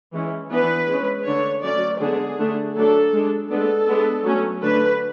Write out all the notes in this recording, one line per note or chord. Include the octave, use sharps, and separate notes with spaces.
E3 G#3 C#4
E3 B3 D4 B4
G#3 C#4
D3 A3 D4 C#5
F#3 A3 C#4 D5
D3 G#3 B3 D4 G#4
D3 A3 D4
F#3 A3 D4 A4
G#3 D4
G#3 B3 D4 A4
G#3 B3 D4
F#3 A3 C#4
D3 A3 D4 B4